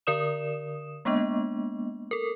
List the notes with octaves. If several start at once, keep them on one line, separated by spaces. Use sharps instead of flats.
D3 A#4 D5 D#6 E7
G#3 A#3 B3 D4 D#5
A4 A#4